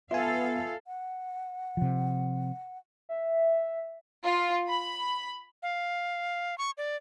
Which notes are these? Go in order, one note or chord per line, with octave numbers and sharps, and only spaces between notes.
B3 F4 A4 E5 F5 G#5
F#5
C3 F3
E5
F4
B5
F5
C#6
D5